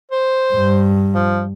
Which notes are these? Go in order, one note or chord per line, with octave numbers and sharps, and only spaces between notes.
C5
G2
F3